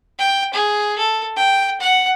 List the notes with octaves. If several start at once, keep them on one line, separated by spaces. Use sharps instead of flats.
G5
G#4
A4
G5
F#5